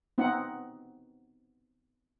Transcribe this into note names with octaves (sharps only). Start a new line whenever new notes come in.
B3 C4 D#4 F#5